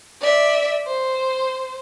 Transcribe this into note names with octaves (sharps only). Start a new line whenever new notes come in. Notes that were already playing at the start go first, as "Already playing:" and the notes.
D5 E5
C5